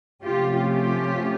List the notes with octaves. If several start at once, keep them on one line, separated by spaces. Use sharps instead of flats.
C3 F3 A3 C#4 F4 G4
F4 G4